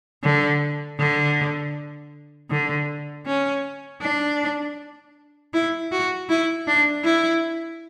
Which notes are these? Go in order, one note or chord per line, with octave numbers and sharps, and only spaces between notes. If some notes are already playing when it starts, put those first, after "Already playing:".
D3
D3
D3
C#4
D4
E4
F#4
E4
D4
E4